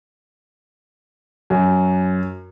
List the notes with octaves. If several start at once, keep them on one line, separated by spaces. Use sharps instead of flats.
F#2